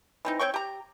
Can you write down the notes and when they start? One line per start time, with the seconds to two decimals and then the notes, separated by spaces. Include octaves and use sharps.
0.25 E3 C4 D#4
0.39 C4 C#5 G5 C#6
0.54 G4 A#5